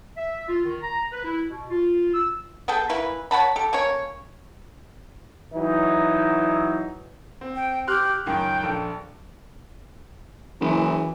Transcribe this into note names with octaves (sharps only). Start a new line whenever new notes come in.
E5
F4
D#3
A#5
B4
E4
B2
F4
E6
B3 G#4 A4 G5
E3 A#3 E4 B4
C#5 F#5 A5 B5
G4 A4
A#3 C#4 C#5
E3 F#3 D#4
C4
G5
G4 C6 F6 F#6
C#2 F#2 D#3 G5
A#1 A4
F#1 E3